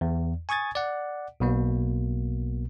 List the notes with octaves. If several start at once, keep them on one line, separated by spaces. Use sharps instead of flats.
E2
G#5 C#6 D#6 G#6 A6
D5 F#5
B1 B2 A#3